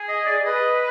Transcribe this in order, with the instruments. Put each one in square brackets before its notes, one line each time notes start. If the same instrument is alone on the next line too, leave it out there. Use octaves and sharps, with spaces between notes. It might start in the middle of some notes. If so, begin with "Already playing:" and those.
Already playing: [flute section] G#4
[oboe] D#5
D5
[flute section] B4 [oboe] D#5